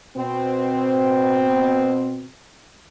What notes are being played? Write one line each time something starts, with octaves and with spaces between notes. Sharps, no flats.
B2 C4